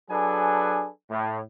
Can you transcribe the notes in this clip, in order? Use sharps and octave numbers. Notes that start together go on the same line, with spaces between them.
F#3 D4 G#4 A4 B4 G#5
A2